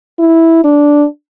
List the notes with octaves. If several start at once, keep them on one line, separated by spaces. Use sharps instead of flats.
E4
D4